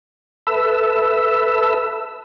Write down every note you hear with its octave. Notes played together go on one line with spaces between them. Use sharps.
A4 B4 E5 E6